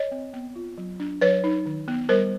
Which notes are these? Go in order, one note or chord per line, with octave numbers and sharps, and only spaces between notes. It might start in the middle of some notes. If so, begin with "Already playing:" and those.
Already playing: C#5 D#5
C4
B3
F4
F#3
D4
F#3 B4 C#5
D#4
D#3
B3
G3 A#4 C5